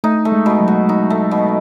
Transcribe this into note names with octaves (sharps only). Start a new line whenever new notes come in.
A3 D#4
A3
G#3
B2
F#3
F#4
D#4
A3
B2